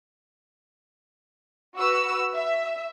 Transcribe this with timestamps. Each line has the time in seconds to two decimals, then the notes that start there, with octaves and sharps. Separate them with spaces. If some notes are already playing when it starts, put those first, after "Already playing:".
1.76 F#4 B4 E6
2.34 E5